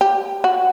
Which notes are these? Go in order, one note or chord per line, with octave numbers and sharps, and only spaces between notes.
G4
F#4